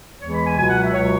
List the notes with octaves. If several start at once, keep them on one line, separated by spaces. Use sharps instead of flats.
E2 E3 G#3 C#5
B5
G#5
C#2 B2 F#3 G#5
F#5
E5
C#2 B2 F#3 C#5